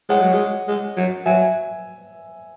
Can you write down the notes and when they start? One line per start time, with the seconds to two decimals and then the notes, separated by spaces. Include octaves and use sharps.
0.09 G#3 C#5 F#5
0.21 F#3
0.33 G#3
0.68 G#3
0.97 F#3
1.26 F#3 E5 G#5